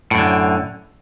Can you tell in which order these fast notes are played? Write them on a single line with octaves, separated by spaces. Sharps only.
A2 F#2 D3